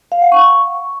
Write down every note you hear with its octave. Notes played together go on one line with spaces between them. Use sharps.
F5
F#5
C#6